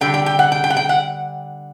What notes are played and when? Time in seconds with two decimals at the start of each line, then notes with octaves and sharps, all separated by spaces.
0.01 D3 G3 G5
0.14 G5
0.26 G5
0.39 F#5
0.52 G5
0.64 G5
0.70 F#5
0.77 G5
0.89 F#5